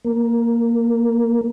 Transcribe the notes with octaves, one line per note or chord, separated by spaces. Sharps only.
A#3